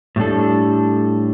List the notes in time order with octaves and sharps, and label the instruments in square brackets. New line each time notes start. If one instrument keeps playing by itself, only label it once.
[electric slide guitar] A2 G3 D4 A4